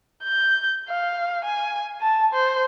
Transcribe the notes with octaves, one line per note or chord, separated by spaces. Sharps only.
G6
F5
G#5
A5
C5